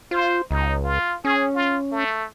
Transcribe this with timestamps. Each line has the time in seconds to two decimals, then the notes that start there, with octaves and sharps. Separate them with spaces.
0.11 F4 C5
0.51 C#2 D#4
0.84 F4
1.25 C#4 G#4
1.55 F4
1.92 A3